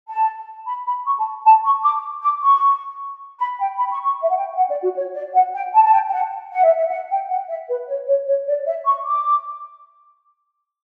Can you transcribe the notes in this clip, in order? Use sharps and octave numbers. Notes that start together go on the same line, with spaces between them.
A5
B5
B5
C#6
A5
A5
C#6
D6
D6
C#6
B5
G5
B5
C#6
C#6
E5
F#5
G5
F#5
D5
F#4
C#5
D5
F#5
G5
A5
A5
G5
G5
F#5
F#5
E5
E5
F#5
G5
F#5
E5
B4
C#5
C#5
C#5
D5
E5
C#6
D6